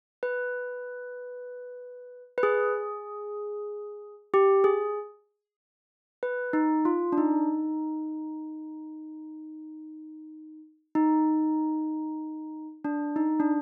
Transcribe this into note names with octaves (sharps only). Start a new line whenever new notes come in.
B4
B4
G#4
G4
G#4
B4
D#4
F4
D4
D#4
D#4
D4
D#4
D4